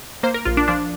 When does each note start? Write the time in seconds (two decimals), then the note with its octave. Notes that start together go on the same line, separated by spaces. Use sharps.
0.23 A#3 C5
0.34 A#4
0.45 A#1 F4
0.57 D4
0.68 F3 D4